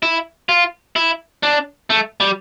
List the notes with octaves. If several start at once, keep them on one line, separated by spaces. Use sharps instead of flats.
E4
F4
E4
D4
A3
G3